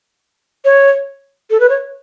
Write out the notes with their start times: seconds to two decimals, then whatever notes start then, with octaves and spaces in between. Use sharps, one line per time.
0.65 C#5
1.51 A4
1.60 B4
1.69 C#5